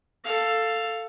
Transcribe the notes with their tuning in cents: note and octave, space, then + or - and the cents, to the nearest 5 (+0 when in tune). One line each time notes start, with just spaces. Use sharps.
A4 +10 F5 +0